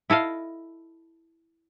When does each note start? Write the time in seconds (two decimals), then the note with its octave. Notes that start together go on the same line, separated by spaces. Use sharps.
0.10 E4 A4 D#5 F5